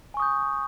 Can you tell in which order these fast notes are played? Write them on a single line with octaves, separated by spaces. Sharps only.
G#5 C#6 D#6 G6